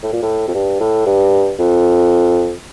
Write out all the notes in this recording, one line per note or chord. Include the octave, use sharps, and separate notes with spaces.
A2
A#2
A2
F2
G2
A2
G2
F2